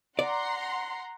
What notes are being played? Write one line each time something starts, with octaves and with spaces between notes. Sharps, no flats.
D5 F#5 A#5 C6